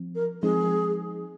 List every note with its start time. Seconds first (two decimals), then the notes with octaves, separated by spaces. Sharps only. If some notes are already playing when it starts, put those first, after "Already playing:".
Already playing: F3 C4
0.15 A#4
0.43 F3 G#3 C4 D#4 G#4